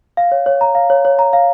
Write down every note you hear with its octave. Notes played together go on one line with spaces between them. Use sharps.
F5
C#5
C#5
A#5
F5
C#5
C#5
A#5
F5